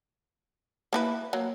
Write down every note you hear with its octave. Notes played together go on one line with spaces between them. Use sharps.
A#3 E4 B4
F#3 A#3